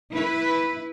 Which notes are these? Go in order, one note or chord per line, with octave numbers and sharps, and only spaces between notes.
E4 B4